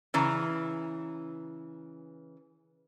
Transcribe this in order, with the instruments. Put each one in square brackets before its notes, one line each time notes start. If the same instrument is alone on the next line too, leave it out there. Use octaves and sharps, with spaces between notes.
[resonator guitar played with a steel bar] C#3 E3 A#5